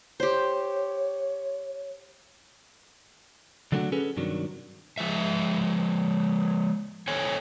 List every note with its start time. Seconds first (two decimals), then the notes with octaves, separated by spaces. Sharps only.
0.20 G4 C5 C#5
3.72 D3 F#3 A3 B3 D4 F#4
3.92 C#4 G#4 A4 B4
4.17 G2 C3 D#3 F#3 D4
4.98 F3 G#3 E5
7.08 A4 C5 C#5 G#5